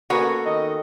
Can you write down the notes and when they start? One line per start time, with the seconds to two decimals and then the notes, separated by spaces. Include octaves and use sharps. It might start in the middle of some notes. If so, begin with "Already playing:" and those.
0.10 A#3 B3 C#4 F#4 A4
0.46 D#3 D#5